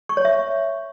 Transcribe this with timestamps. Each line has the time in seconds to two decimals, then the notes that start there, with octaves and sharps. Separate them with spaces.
0.09 C#6
0.17 C#5
0.25 E5